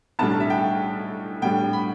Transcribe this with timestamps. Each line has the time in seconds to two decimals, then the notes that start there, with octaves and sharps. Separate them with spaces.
0.19 B1 A2 G3 D4 A5
0.40 E5
0.50 G5
1.42 A2 G3 D4 G5
1.73 B5